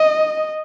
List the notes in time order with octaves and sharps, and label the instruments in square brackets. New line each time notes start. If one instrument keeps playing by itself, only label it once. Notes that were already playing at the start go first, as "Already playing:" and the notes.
Already playing: [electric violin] D#5